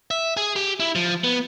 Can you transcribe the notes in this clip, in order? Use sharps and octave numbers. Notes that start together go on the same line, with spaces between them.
E5
G#4
G4
E4
F3
B3